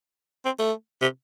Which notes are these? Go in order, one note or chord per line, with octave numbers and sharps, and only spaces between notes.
C4
A3
C3